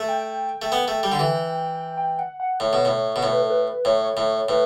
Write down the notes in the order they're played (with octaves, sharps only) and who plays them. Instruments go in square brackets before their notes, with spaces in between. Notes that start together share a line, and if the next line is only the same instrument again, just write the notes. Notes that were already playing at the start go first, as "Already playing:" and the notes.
Already playing: [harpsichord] A3
[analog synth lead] G5
[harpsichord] A3
B3
A3
G3
D3
E3
[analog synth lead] G5
F#5
F#5
[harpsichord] A2 [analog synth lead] C#5
[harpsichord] B2
A2
B2
[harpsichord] A2 [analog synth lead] C#5
[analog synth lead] B4
A4
B4
[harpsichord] A2 [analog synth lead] C#5
[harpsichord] A2
[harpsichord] A2 [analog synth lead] B4